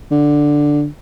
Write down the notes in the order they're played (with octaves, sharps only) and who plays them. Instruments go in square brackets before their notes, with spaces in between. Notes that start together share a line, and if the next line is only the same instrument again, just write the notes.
[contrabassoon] D3